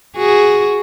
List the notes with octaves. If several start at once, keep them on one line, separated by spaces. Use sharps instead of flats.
F#4 G#4